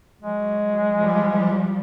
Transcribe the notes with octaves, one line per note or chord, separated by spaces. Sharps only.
F#3 G#3
F3 G3